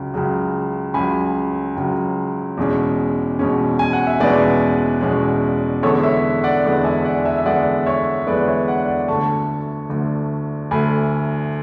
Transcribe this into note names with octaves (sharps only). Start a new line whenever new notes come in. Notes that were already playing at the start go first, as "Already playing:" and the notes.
Already playing: C#2 C#3 F#3
C#2 C#3 F#3
C#2 C#3 F#3 G#5 B5
C#2 C#3 F#3
E2 B2 G#3 C#4
E2 B2 G#3 C#4
G#5
F#5
E5
E2 B2 G#3 C#4 B4 D5
E2 B2 G#3 C#4
E2 D3 G#3 B3 A4 C#5
C#5 E5
D5 F#5
E2 D3 G#3 B3
E5 G#5
D5 F#5
E5 G#5
E5
E2 D3 G#3 B3 D5 F#5
C#5 E5
E2 D3 G#3 B3 B4 D5
C#5 E5
D5 F#5
D5 F#5
D2 D3 A3 A5 C#6
D2 D3 A3
D2 D3 A3 G#5 B5